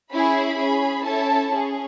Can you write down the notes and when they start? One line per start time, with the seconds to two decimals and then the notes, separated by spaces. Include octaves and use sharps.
0.12 C#4 E4 G#4 B5
0.58 C#4 G#4
1.04 C#4 E4 A4 A5
1.51 C#4 G#4